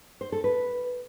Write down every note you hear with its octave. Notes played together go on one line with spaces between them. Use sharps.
C5
A4
B4